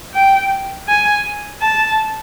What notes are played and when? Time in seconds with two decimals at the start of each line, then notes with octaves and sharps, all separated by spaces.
0.14 G5
0.88 G#5
1.62 A5